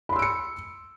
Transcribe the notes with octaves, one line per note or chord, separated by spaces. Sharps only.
B5 C6 E6 C#7 D7